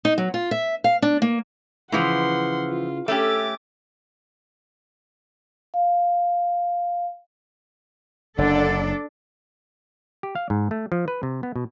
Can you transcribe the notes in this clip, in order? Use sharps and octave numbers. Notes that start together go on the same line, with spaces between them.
D#4
F#3
F4
E5
F5
D4
A#3
C#3 E3 F3 B3 E4 F#5 C6
F4
A3 C#4 G4 D6 A6
F5
F#1 D3 D4 A4 D5
G4
F5
G#2
A3
F3
B4
C3
B3
B2